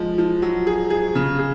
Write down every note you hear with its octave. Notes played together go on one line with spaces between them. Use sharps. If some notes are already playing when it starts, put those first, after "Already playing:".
Already playing: F3 G#3
F3
F#3
G#4
G#4
C#3
G#4